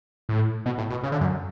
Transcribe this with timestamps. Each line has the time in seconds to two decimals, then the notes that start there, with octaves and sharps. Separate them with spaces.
0.29 A2
0.66 B2
0.78 A2
0.90 B2
1.03 C#3
1.12 D3
1.21 F#2